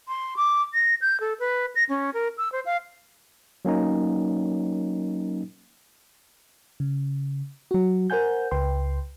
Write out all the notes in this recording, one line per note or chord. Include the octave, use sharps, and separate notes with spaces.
C6
D6
A#6
G6
A4
B4
A#6
C#4
A#4
E6
C5
F5
F#3 A#3 C#4 D#4
C#3
F#3 F#4
A#4 C5 F#5 G#5 G6
C#2 B4 G5 C6